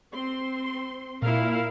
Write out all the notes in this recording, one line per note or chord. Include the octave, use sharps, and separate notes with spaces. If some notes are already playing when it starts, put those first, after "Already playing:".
C4 C6
A#2 E4 A#4 F5